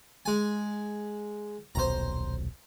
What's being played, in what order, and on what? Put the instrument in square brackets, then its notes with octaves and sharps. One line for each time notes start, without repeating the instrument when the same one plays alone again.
[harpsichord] G#3 G#5
[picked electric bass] D#1 B1 [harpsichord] C5 A#5